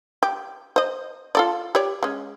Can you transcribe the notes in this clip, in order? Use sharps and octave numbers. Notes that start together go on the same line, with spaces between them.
G4
C5 D#5
F4 A4 D5
G4 C#5 D5
G#3 C#4